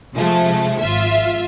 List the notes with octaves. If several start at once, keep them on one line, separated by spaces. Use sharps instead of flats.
C3 F3 G#3 A3
G#1 F4 E5